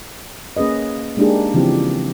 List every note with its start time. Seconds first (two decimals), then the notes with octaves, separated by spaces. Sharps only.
0.57 A#3 C#4 G#4 B4 D#5
1.17 G#3 A#3 D4 D#4 G4 G#4
1.54 C#3 E3 F3 C4 G4